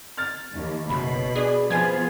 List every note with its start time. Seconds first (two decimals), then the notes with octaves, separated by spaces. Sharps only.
0.17 F6 A6
0.53 D#2
0.89 F#1 B2 B5
1.35 D4 G#4
1.70 F3 B3 F4 G#4 G#5 G#6